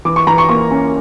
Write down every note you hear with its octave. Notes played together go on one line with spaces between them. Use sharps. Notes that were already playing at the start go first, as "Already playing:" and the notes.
E3 D6
C#6
E3 A#5
C#6
A#3 C#6
C#4